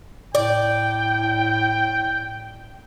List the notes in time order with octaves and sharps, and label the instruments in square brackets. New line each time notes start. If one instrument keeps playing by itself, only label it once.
[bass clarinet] A2 [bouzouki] D5 [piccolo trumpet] G5